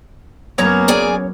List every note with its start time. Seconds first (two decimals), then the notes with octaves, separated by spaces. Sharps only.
0.58 F#1 F#3 A#3 B3 C#4 C#5 A#5
0.88 G#4 D5 G#5